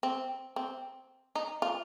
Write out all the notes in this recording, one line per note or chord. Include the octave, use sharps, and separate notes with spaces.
C4
C4
D#4
F4